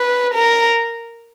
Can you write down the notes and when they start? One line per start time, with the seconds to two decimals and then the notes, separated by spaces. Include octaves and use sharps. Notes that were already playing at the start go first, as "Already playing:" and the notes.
Already playing: B4
0.33 A#4